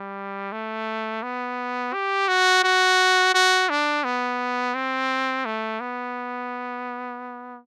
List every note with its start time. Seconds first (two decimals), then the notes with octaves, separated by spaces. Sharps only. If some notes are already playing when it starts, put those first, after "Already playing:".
Already playing: G3
0.52 A3
1.23 B3
1.93 G4
2.28 F#4
2.64 F#4
3.34 F#4
3.70 D4
4.04 B3
4.75 C4
5.45 A3
5.80 B3